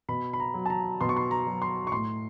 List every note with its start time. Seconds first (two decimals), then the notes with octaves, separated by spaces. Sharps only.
0.08 B2 B5
0.33 B5
0.40 A#5
0.54 F#3
0.66 A5
0.70 A#5
1.01 B2 C6
1.09 C#6
1.17 C6
1.31 A#5
1.47 F#3
1.62 C6
1.87 C#6
1.92 A2 C6